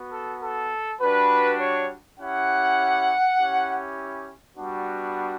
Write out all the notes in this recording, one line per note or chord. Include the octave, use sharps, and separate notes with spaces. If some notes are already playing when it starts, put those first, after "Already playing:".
Already playing: B3 F#4
A4
A4
G3 D4 F#4 B4
C#5
C#4 E4 G4 F#5
C#4 E4 G4
G3 B3 D4 F#4